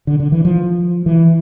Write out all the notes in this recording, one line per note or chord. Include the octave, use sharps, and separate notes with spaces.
D3
D3
E3
F3
E3